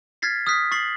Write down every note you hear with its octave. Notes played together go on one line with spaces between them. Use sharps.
F6 G#6 A6 B6 C7
D#6 F6 F#6 B6
C#6 A6 C7 F#7